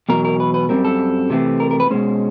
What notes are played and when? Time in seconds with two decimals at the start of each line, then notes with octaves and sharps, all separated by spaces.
0.09 E2 B2 F#3 A#4
0.25 A#4
0.40 B4
0.54 B4
0.69 F#2 D#3 G3 C4 A#4
0.85 A4
1.30 C3 E3 A3 C4
1.60 A#4
1.71 A#4
1.80 B4
1.91 B2 G#3 C#4 C5